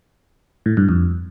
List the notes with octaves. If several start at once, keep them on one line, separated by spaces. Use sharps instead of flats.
A2
G2
F2